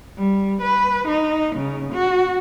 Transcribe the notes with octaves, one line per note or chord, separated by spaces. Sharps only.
G3
B4
D#4
C#3
F#4